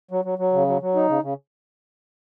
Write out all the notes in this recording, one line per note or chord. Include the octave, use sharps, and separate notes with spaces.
F#3
F#3
F#3
C#3
F#3
F#3
D#4
C#3
C#3